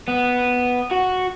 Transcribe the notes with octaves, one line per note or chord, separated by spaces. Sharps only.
B3
F#4